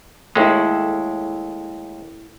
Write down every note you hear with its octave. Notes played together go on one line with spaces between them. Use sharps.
D#2 G#3 A3 E4